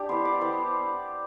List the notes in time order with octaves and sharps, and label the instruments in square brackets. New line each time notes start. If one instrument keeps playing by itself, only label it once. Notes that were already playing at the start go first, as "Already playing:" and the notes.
Already playing: [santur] D4 G4
B3 E4 C5
D5
B3 E4 C5